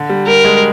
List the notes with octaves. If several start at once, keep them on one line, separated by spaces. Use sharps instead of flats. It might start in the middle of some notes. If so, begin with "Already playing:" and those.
Already playing: D3
G3
G3 A#4
G#3